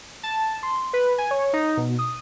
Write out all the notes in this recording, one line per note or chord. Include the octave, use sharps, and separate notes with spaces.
A5
C6
B4
G#5
C#5
D#4
B2
D#6